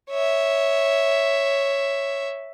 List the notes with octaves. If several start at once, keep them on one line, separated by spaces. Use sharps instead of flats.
C#5 E5